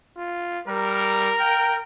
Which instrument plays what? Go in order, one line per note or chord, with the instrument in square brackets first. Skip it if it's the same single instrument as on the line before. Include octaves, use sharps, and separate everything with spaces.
[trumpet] F4
[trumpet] G3 [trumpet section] A#4
[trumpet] G5